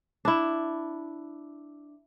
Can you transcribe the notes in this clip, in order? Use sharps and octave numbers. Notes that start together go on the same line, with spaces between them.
D4 E4